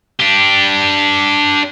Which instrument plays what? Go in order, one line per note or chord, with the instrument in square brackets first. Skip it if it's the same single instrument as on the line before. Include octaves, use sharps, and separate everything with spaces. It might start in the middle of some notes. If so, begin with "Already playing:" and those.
[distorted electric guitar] D4 G4